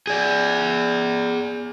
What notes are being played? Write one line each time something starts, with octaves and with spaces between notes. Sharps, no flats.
G#4 D5